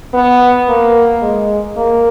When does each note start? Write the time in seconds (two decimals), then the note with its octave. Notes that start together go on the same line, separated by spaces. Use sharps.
0.13 B3
0.68 A#3
1.22 G#3
1.77 A#3